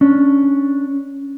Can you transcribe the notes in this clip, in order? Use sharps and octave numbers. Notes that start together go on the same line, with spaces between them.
C#4 D4